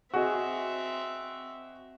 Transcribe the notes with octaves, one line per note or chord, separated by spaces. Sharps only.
C4 F#4 G#4 D#5 E5